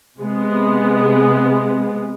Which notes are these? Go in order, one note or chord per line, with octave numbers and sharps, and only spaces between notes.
C3 G#3 B3